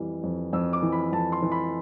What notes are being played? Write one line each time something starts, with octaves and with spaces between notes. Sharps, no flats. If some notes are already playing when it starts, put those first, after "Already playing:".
Already playing: F2 E3 G3
F2
F2 E6
D6
E3
B5
F2 A5
C6
E3
B5